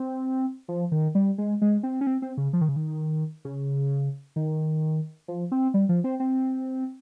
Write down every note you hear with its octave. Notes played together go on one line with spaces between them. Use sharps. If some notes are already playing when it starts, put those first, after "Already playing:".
Already playing: C4
F3
D#3
G3
G#3
G#3
C4
C#4
C4
C4
C#3
F3
D#3
C#3
D#3
C#3
D#3
F3
C4
G3
F3
C4
C4